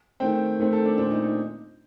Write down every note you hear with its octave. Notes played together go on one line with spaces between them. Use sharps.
D#3 A3 C4 G5
D#3 A3 C4
A4
D4
A#2 A3 C4 D4
D#4
D#4